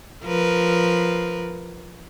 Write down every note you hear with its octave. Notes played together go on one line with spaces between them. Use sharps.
F3 A#4 B4